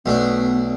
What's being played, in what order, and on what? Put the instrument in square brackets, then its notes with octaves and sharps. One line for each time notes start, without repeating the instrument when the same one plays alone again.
[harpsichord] B1 B2 A3 D4 [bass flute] B3